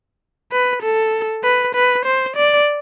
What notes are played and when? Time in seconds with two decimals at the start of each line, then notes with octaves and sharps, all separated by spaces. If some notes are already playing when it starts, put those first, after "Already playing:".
0.52 B4
0.82 A4
1.44 B4
1.75 B4
2.05 C5
2.36 D5